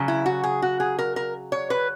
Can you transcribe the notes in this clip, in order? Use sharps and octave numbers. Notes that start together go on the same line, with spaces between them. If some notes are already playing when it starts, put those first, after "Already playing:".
Already playing: C#3 F#3
E4
F#4
G#4
F#4
G#4
A#4
A#4
C#5
B4